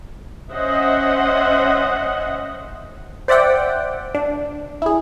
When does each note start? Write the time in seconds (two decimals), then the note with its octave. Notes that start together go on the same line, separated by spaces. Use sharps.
0.53 C#4 C5 D#5 E5 F#5
3.28 C5 D5 E5 F#5 G5
4.15 D4
4.82 E4 G#4